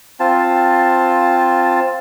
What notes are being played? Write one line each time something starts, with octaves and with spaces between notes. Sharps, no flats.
C4 F4 A5